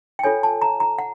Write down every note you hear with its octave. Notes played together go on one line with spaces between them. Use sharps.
G5
F4 A4 C#5 G#5
A5
A#5
A#5
F#5